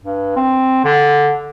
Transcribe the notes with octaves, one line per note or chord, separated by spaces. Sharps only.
G2
C4
D3